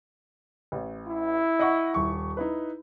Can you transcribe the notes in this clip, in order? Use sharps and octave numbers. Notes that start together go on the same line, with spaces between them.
A1
E4
D#5 F#5 C#6
D#1 C#6
D#4 E4 B4